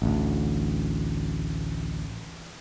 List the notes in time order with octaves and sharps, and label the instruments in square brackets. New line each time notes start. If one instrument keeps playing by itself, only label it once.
[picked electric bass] A1 D2